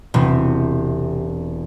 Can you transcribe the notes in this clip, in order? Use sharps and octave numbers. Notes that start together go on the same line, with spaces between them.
E1 C3